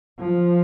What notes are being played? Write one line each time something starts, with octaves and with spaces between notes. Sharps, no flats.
F3